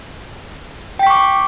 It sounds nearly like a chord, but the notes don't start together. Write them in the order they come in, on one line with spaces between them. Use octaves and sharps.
G5 B6 C#6 D6